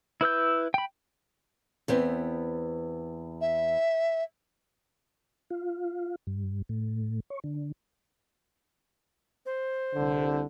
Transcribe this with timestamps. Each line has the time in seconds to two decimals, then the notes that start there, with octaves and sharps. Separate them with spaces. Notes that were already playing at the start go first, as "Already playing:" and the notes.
0.21 E4 B4 E6 G6
0.74 G5 B5
1.88 E2 B3 C4
3.41 E5
5.50 F4
6.27 G2
6.69 A2
7.30 C#5
7.44 D3
9.46 C5
9.95 C2 D3